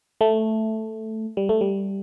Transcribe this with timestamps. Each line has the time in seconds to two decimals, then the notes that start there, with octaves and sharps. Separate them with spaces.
0.21 A3
1.37 G3
1.49 A3
1.61 G3